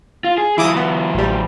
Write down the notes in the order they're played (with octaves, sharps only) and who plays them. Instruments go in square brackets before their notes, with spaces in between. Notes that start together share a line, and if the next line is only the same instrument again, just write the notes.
[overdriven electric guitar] F4
G#4
[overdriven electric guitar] E3 F#3 [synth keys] E4 D6 D#6
[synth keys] B3
A1 G3